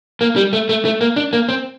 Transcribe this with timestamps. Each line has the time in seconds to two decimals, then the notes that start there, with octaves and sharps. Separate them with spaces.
0.21 A#3
0.36 G3
0.53 A3
0.69 A3
0.85 A3
1.01 A#3
1.16 D4
1.33 A#3
1.49 C4